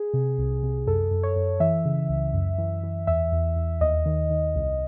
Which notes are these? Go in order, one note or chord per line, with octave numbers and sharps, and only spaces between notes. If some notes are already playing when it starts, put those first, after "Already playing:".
Already playing: G#4
C3
C2
C3
F#2 A4
F#2
C#5
F#2
E3 E5
C#3
C#2
F#2
E3
E3
E2 E5
E2
E2
D#2 D#5
D#3
D#3
C2